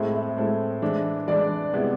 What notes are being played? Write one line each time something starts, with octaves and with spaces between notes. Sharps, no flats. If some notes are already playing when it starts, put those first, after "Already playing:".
Already playing: A2 G#3 C4 E4 A4 E5
E5
A2 G#3 C4 E4 A4
E3 G#3 D4
E3 G#3 D4 D5
C3 G#3 B3 E4